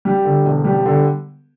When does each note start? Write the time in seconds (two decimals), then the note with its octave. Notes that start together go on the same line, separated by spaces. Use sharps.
0.05 G3
0.24 D3
0.45 E1
0.65 G3
0.85 D3